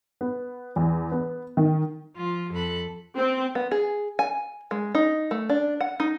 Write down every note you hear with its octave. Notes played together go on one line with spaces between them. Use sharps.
B3
E2
B3
D#3
F3 F4
F2 A4 B5 F#6
C4
B3
G#4
G#5
G#3
D#4
A3
D4
F#5
D#4